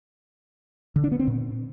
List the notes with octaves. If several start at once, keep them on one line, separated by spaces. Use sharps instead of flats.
D3
D4
B3
C4
A#2